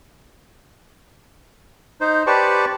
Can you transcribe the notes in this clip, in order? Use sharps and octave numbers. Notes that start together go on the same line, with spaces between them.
D#4 C5
G4 B4 C5 D5 A5 C#6